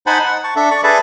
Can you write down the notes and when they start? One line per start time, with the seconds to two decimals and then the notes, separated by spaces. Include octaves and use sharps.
0.07 D#4 C5 F#5 G#5 A5 B5
0.25 F#5
0.44 A5 C#6
0.56 D4 A4 E5
0.71 D5 C#6
0.83 G#4 A4 B4 D5 E5 A5